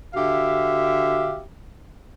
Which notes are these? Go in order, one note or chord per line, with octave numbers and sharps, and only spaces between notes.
D3 F#4 G4 E5 F5